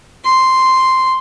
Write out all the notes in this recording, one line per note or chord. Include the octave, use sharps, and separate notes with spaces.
C6